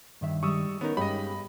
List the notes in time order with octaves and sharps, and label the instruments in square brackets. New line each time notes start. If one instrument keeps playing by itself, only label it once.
[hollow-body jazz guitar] G2 D#3 E5
[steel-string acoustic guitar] G3 G#3 [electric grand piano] C#6 D#6 E6
[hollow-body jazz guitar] D#3 [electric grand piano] B3 D#4 [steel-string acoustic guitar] C#4 A#4
[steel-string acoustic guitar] G2 [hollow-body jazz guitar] G#3 C#4 G4 [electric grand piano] D#5 B5